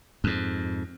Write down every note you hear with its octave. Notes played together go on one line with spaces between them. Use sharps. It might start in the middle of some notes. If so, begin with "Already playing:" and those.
F2 G#2